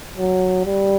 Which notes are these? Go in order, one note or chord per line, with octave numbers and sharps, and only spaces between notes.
F#3
G3